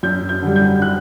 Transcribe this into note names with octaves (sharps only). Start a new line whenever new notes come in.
F#2 G6
G6
D3 G3
G6
F#6